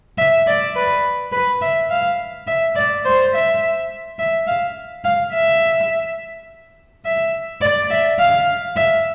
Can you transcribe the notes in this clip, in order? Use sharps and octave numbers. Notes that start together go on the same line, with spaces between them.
E5
D5
B4
B4
E5
F5
E5
D5
C5
E5
E5
F5
F5
E5
E5
D5
E5
F5
E5